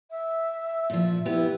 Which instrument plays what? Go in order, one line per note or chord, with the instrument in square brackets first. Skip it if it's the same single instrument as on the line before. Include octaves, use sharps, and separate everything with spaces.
[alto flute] E5
[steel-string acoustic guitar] A#2 F3
[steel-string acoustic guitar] B3 G4 B4 [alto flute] E4